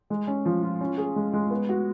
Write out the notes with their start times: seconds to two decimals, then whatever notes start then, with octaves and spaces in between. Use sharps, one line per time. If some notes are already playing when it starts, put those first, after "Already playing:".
0.10 G#3
0.27 C#4
0.45 F3
0.63 F4
0.81 C#4
0.98 G#4
1.16 G#3
1.33 G#3
1.50 B3
1.69 F#4